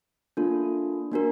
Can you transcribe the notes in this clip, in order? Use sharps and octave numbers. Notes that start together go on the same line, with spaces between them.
A#3 D4 F4 A4
A#3 D4 F#4 A#4